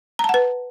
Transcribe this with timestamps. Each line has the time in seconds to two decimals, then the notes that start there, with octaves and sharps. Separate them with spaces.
0.19 A#5
0.24 A5
0.29 F#5
0.34 B4